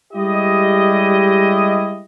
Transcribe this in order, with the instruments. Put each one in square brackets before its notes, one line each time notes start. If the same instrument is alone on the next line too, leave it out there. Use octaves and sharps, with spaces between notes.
[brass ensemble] G3 G#3 E4 G4 D#5